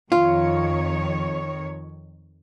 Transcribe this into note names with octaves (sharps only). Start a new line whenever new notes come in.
F2 D#3 F4 C#5